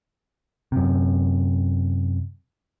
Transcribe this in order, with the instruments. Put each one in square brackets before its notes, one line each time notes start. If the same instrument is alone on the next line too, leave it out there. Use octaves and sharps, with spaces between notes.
[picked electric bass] F#2 C3